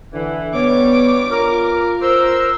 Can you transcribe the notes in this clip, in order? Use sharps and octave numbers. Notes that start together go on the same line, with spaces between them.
D3 E3
G2 G3 B3 C#5 D6
F4 A#4
A#4 C5 E6